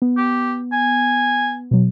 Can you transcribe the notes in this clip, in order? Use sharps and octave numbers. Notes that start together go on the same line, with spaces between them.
B3
G4
G#5
B2 F#3